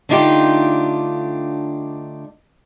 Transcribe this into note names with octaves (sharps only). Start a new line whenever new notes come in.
D3 A3 D4 D#4 F4 G4